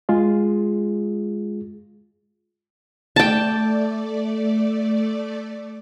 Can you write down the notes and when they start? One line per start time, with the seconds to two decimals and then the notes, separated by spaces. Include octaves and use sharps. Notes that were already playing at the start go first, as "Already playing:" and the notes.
0.09 G#3 F4 G#4
3.16 A3 D5 G5 A5